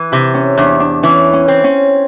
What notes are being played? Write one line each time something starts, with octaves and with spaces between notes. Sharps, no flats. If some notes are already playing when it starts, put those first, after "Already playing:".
Already playing: E3
C3 E4
C#4
E2 D4
D4
E3 C#4
C#4
C4
C#4